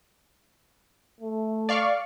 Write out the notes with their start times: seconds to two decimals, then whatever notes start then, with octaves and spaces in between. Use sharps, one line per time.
1.21 A3
1.69 D5 F5 C#6